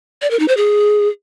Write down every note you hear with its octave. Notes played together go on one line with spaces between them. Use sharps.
D5
A#4
D#4
C5
G#4